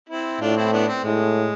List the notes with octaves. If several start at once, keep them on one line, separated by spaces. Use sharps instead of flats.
C4 E4
A2 D4 F4
C4 E4
B3 D4
C4
A2 G#3